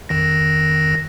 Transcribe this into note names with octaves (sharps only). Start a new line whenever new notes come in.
F2 D#3 A#6